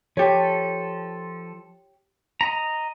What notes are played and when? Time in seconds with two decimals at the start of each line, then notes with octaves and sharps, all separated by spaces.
0.17 F3 G4 A4 C#5
2.41 D#5 A#5